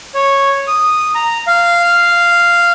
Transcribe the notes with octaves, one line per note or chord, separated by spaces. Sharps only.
C#5
D#6
A#5
F5